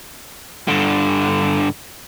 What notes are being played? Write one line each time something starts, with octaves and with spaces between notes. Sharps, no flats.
G2 D3